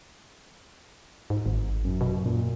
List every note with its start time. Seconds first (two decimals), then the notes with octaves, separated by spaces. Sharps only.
1.30 G#2
1.46 G#1
1.85 F#2
2.01 B2
2.25 A#2